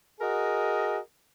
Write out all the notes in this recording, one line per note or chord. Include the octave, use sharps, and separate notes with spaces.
F#4 G#4 A#4 D#5